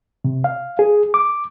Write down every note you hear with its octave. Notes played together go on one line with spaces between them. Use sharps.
C3
F5
G#4
D6